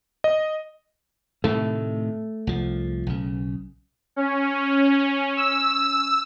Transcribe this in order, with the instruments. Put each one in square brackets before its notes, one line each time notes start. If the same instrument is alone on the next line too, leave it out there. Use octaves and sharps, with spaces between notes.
[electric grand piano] D#5
[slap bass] A2 C3 D#3 [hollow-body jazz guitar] A3
[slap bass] C2 F3
B1 C#3
[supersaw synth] C#4
E6